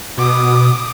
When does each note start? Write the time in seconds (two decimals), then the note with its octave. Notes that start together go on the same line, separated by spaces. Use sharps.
0.18 B2 D6 D#6